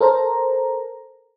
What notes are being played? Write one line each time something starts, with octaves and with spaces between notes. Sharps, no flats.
A4 A#4 C5 A#5